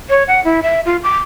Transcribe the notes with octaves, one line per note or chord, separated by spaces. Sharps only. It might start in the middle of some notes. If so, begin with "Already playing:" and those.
C#5
F#5
E4
E5
F4
D6